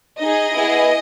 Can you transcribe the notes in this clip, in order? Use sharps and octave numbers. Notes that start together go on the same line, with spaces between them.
D#4 G#4 D#5
B3 E4 G#4